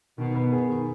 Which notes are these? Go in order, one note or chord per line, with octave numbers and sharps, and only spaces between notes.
B2 D#3
B3
G#4
D#3